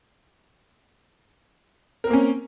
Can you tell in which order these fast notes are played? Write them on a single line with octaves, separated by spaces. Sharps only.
A#4 C4 A#3 C#4